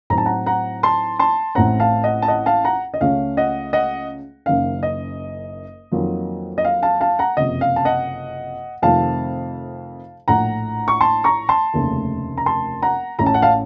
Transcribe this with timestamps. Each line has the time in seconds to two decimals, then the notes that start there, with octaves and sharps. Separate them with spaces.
0.10 A2 F#3 C4 D#4 A#5
0.18 A5
0.26 F#5 A#5
0.46 F#5 A#5
0.83 A5 C6
1.19 A5 C6
1.55 A1 A2 A3 C4 F#5 A#5
1.80 F5 A5
2.04 D#5 F#5
2.22 A5
2.28 D#5 F#5
2.46 F5 A5
2.65 F#5 A#5
2.94 D#5
3.01 C#2 C#3 A3 C#4 F5
3.37 D#5 F#5
3.73 D#5 F#5
4.46 F#1 F#2 D#3 F5
4.83 D#5
5.92 F2 D#3 F#3 A#3 F4
6.58 D#5
6.65 F5
6.82 F5 A5
7.01 F5 A5
7.19 F#5 A#5
7.37 F#1 F2 C3 D#5
7.61 F5
7.76 A5
7.85 D#5 F#5
8.82 F2 C3 D#3 A3 C4 F5 A5
10.28 A#1 A2 A3 F#5 A#5
10.88 C#6
11.01 A5 C6
11.24 A#5 C#6
11.49 A5 C6
11.74 F1 D#2 C#3 A3
12.37 A#5
12.46 A5 C6
12.82 F#5 A#5
13.19 A1 A2 A3 C#4 A#5
13.26 A5
13.34 F#5
13.42 F5 A5